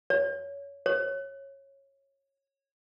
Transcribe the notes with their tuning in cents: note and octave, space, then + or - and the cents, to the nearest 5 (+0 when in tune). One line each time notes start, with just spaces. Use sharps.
C#5 +20
C#5 -15